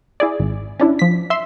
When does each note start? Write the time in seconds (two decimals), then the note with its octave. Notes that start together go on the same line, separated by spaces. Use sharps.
0.20 E4 G#4 D5
0.40 G#1
0.80 C#4 D4 E4
0.99 F3 B6
1.30 E5 C6